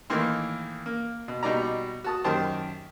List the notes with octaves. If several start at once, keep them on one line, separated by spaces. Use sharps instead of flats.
A2 D#3 E3 A#3 C6 F6
A#3
B2
B2 G3 D#4 D5 A#5
F#4 A5 D#6
F#2 D#3 G4 C5 A5